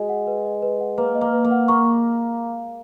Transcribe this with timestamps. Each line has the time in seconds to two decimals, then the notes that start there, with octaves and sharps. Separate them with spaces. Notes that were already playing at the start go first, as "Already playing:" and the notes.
Already playing: G#3 F#4
0.09 F#5
0.27 B4
0.45 D#5
0.62 B4
0.80 F#5
0.98 A#3 B4
1.15 D#5
1.21 A#3
1.33 B4
1.45 A#3
1.51 F#5
1.68 A#3 C#6